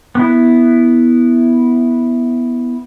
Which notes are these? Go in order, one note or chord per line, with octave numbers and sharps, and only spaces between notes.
B3 E4